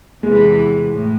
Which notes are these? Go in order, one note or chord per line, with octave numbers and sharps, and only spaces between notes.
E2 C3 E3 G#3
A2